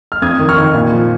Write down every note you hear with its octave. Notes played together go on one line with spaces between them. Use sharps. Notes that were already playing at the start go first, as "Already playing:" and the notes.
F6
F2 D#6 G#6
D#3
C#6 F6
D#3
A#2
F3